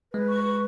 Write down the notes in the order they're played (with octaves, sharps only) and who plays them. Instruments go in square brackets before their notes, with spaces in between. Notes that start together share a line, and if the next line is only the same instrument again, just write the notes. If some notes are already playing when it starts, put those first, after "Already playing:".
[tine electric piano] G#3 [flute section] B4
[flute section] C#6
B4